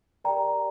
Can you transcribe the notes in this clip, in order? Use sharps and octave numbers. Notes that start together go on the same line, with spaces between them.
G4 A#4 D5 G5 A#5